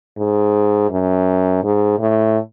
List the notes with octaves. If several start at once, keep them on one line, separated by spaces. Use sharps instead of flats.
G#2
F#2
G#2
A2